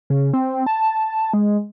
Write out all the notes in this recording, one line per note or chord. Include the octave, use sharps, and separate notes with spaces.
C#3
C4
A5
G#3